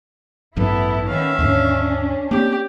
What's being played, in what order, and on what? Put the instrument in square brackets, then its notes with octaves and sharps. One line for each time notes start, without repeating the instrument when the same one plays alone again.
[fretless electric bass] A1 G2 F#3 [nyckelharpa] B3 A4 [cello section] E4
[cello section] D#3 B3 C#4 [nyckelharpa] E5 F5
[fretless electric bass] D#2 G#2 D3 [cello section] C#4 D4
[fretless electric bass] A#3 C4 [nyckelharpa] G4